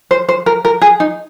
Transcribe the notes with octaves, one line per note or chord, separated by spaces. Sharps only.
C5
C5
A#4
A#4
G#4
D#4